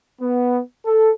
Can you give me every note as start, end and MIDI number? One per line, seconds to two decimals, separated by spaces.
0.21 0.60 59
0.86 1.11 69